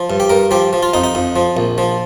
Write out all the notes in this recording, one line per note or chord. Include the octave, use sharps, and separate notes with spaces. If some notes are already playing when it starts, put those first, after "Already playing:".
Already playing: F3
G2
G4
G2 A#4
F3 G4
F3
F4
F2 D#4
D#4
F2
F3
A#1
F3